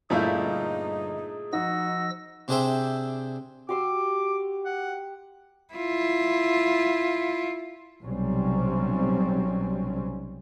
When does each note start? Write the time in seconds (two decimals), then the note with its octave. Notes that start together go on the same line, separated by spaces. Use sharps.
0.10 G1 A#2 A3 D#4 E4 G#4 F5 G6
1.53 F3 D#4 F#4 E6 A#6
2.48 C3 D4 G#4 C5 E5 G5
3.69 F#4 G4 C6 D6 E6
4.65 F#5
5.74 E4 F4
8.02 B1 C3 F#3 G3 C4 C#4